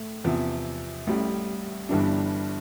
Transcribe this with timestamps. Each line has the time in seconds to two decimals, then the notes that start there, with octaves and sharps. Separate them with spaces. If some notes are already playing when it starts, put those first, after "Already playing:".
Already playing: A2 A3
0.24 E2 C3 F3
1.07 A1 A2 G3
1.89 G1 G2 E3 G3 D4